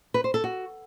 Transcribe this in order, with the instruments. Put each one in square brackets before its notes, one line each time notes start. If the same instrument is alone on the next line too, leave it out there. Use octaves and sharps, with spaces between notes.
[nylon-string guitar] B4
C5
A4
F#4